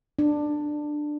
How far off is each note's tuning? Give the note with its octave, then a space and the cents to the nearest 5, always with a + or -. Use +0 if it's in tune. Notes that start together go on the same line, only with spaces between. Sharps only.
D4 +15